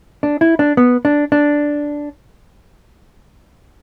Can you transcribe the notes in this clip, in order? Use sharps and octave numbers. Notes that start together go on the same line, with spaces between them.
D4
E4
D4
B3
D4
D4